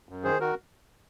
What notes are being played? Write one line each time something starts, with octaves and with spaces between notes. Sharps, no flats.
F#2
D#3 G#4 C5
D#3 F#4 A#4